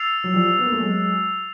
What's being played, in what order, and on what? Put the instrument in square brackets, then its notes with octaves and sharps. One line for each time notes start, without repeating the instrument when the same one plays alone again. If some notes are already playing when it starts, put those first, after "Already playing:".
Already playing: [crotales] E6 A6 C7 F7
[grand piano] F#3
F3 G3
B3
A#3
A3
F#3 G#3